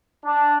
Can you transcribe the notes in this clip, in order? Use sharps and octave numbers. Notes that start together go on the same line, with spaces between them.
D4